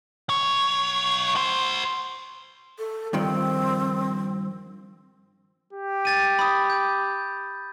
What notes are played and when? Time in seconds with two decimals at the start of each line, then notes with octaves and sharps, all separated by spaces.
0.29 B1 C#5
1.36 F#4 C5
2.79 A4
3.13 G2 D#3 F3 C4
5.73 G4
6.05 G#6 A6 D#7
6.39 B5 D#6
6.70 G6